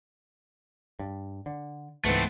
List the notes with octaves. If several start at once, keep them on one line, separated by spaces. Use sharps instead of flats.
G2
D3
C#2 G#2 E3 A3 B3 C4